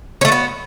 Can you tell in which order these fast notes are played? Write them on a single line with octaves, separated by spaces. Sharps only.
C#4 A3 F#4 B3